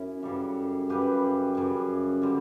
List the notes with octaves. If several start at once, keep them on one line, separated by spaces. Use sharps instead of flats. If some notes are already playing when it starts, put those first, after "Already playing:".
Already playing: F#2 C#4 E4
F#2 C#3 G3 A4 C#5
F#2 C#3 G3 G4 B4
F#2 C#3 G3
D3 G3